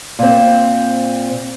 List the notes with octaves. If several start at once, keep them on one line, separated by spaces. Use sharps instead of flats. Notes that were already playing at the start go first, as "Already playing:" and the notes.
A#2 C4